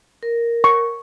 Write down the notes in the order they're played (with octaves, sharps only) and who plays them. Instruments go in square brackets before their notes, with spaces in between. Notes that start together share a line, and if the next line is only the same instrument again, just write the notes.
[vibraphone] A#4
[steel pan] C#6